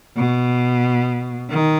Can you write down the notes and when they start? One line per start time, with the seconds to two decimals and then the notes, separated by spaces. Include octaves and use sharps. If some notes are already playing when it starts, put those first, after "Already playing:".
0.16 B2
1.49 D#3